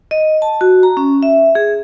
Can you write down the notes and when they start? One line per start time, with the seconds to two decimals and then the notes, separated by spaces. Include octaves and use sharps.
0.11 D#5
0.42 A5
0.61 F#4
0.83 A#5
0.97 C#4
1.23 E5
1.55 G#4